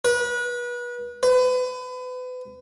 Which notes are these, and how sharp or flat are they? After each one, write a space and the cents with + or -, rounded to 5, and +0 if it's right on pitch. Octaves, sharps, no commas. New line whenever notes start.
B4 -30
B4 +35